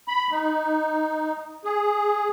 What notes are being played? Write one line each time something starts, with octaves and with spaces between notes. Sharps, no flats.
B5
D#4
G#4